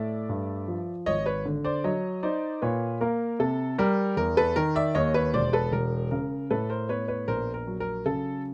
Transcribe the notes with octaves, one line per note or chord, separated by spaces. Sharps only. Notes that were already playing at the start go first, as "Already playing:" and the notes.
Already playing: A2 A3 D5 E5
G2
F3
G#1 C#5 D#5
B4 C#5
D3
C5 D5
F#3 C#5 D#5
D#4 C5 D5
A#2 B4 C#5
A#3 A#4
C3 A4
G3 A#4
E2 A#4
A4 B4
D#3 A#4
D5 E5
D#2 C#5 D#5
B4 C#5
E1 C5 D5
A4 B4
E1 A#4
C#3 A#4
A2 A4 B4
A#4 C5
B3 B4 C#5
B4 C#5
A#1 A#4 C5
A#4
F#3
A#4
C#3 A4